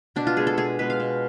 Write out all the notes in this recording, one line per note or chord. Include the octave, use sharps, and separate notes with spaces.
B2 D4
F4
G#3 B3 G#4
A4
B2 G#4
G#3 B3 B4
F5
B2